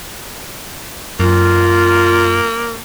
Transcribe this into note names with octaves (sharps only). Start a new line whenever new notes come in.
F#2 A#3 F4